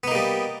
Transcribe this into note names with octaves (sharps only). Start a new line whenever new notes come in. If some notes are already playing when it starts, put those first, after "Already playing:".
G3 A#3 B3 D#4